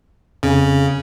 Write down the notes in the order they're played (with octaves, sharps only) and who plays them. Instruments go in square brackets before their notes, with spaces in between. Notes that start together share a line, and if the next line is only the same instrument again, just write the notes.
[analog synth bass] F2 [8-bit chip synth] C#3